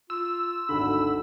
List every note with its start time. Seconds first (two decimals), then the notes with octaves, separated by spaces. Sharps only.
0.10 F4 E6
0.69 G#1 D2 D3 B5